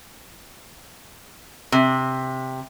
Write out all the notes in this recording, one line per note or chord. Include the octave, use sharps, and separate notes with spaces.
C3